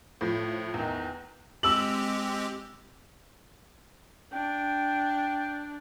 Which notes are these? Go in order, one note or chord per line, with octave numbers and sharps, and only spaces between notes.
A2 F3
E2 D#3
G#3 C4 G4 E6 F#7
D4 G5